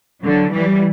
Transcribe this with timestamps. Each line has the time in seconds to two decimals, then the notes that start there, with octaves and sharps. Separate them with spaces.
0.24 D3 F#3
0.52 E3 G3